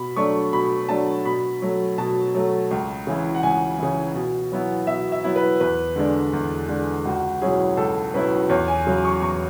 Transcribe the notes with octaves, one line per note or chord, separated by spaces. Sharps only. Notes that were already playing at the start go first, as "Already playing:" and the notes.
Already playing: B2 B5
F#3 A3 D4 C#6
B2 B5
F#3 A3 D4 A5
B2 B5
F#3 A3
B2 A5
F#3 A3
C#2
C#3 E3
F#5
C#2 G#5
C#3 E3
B2
F#3 B3 E4
B2 E5
E5
F#3 B3 E4
B4
E2 B4
D3 G#3 D4
E2
D3 G#3 D4
C#2 F#4
B2 F#3 C#4 E4 G#4
C#2 A4
B2 F#3 C#4 E4 B4
E2 C#5
G#5
C#3 F#3
C#6
E2 C#6